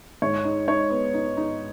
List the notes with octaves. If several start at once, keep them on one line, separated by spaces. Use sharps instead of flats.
G#2 C#5
D#4
D#4 C#5
B3
D#4
D#4